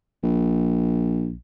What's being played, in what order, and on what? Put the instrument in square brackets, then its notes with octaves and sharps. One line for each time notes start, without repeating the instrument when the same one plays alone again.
[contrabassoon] A#1